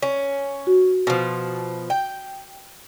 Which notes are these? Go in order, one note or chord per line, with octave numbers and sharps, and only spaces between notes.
C#4
F#4
B2 F3
G5